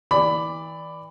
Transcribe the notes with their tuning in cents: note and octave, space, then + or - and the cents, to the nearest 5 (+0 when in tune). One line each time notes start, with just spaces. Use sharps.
E3 -35 D5 +0 B5 +15